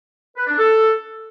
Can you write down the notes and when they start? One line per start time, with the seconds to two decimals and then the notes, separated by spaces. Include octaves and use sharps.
0.36 B4
0.47 D4
0.58 A4